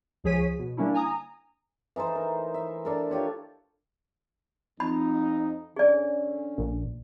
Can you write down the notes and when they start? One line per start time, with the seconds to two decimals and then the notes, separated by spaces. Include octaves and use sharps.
0.24 C#2 F3 G#4 C#5 B6 D#7
0.59 B2
0.77 D3 G3 A#3 C#4 D4 E4
0.94 G#5 A#5 D#6
1.96 E3 D#4 A4 C5
2.15 A#4
2.54 E5
2.85 D4 A4 A#4
3.10 F4 G4 C#5 F#5
4.80 F2 D#4 B5
5.76 D3 C#4 G#4 D5
6.58 A#1